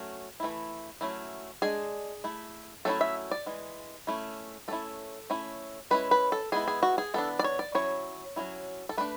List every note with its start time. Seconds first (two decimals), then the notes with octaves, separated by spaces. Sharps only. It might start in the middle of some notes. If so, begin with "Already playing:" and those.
Already playing: F#3 A3 C#4
0.40 E3 A3 E4
1.01 F#3 A3 C#4 E4
1.62 G#3 D4 G#4
2.24 A3 E4
2.85 F#3 A3 C#4 E4 A4
3.01 E5
3.31 D5
3.46 E3 G#3
4.07 A3 C#4 E4
4.68 A3 C#4 E4 A4
5.30 A3 C#4 E4
5.91 G#3 C#4 E4 B4
6.11 B4
6.32 A4
6.52 G#3 B3 E4 G#4
6.68 G#4
6.83 F#4
6.98 G#4
7.14 E3 B3 D4 A4
7.39 D5
7.44 C#5
7.59 D5
7.75 F#3 C#4 E4 C#5
8.36 F#3 C#4 E4
8.89 A4
8.97 A3 D4 B4